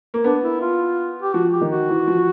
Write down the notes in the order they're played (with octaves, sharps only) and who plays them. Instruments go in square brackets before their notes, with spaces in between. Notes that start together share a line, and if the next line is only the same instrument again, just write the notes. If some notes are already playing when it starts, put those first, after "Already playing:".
[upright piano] A#3
[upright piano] B3 [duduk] D4
[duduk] E4
F4
G4
[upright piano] F3 [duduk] F#4
[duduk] G4
[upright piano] D#3
[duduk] F#4
[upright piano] E3
F3